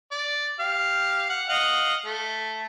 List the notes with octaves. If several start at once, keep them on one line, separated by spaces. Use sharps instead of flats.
D5
G4 F5
F#5
D#5 F5 F#5
A3